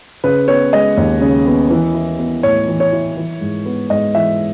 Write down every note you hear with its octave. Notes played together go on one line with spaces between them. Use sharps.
C#3 B4
B3 C#5
G#3 D#5
D#2
C#3
B3
E3
E4
B3
A2 C#5
E3
C#5
E4
E3
G#2
B3
G#2 D#5
E3 E5